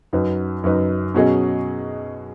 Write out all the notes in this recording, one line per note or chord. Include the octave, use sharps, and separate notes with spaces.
F#2 F#3 D#4 B4
F#2 F#3 D#4 B4
B2 F#3 C#4 G#4 D#5